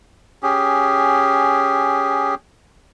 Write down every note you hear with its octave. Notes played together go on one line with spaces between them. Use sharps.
C#4 G4 G#4